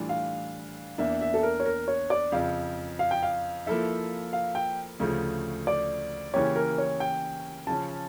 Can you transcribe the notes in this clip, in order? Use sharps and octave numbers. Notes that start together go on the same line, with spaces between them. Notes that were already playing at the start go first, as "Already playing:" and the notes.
Already playing: A2 E3 G3 D4 F4
F5
E2 E3 A#3 D4 E5
E5
A4
A#4
C#5
A#4
C#5
D5
F2 C#3 F3 F5
F5
G5
F5
F3 A#3 E4 A4 E5
F5
G5
D2 C#3 F3 A3
D5
C#3 E3 A#3 C#4 G4 C#5
A#4
C#5
G5
C#3 F3 C#4 A5